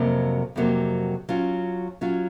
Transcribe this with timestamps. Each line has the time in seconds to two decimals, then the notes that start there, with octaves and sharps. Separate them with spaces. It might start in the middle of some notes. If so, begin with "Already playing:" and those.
Already playing: F2 C3 F#3 A#3
0.56 F2 C3 F#3 A#3
1.29 F#3 C#4 F4
2.01 F#3 C#4 F4